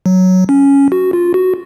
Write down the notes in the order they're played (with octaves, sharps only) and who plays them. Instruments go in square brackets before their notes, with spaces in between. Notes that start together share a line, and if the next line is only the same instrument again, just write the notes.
[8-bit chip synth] F#3
C#4
F#4
F4
F#4